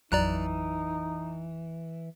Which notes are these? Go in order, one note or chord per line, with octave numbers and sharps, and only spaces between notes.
A1 F2 E3 F#3 D#4 D5 A#5 F#6